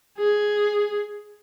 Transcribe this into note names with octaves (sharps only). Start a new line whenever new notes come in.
G#4